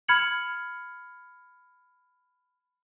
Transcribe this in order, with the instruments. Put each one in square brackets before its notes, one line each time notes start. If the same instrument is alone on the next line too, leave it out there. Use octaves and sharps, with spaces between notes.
[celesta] B5 F6 G#6 C#7 F#7